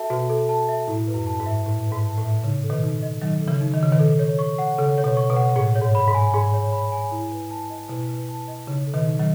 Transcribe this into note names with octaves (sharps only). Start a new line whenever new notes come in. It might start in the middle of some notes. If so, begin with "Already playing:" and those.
Already playing: F#4 A4 E5 A5
B2 F#4
A4
A5
E5
A2 E4
B4
F#2
A5
G#2
E5
A2 E4
B4
G#2
A5
A2
E5
C#3 D#4
A4
B2 D#3
D#4
D#5
D#3 F#3 D#4
A4
C#3 E3
D#4
D#3
C#3 D#5
B2 D#3
A4
C#5
C#6
F#5
C#3 A4
C#5
B2
C#6
B2
F#5
A2 G#4
C#5
G#2
B5
G#2
G#5
G#2 G#4
C#5
B5
G#5
E4
B4
A5
D#5
B2 E4
B4
A5
D#5
C#3 D#4
A4
B2 D#3
D#4
D#3 F#3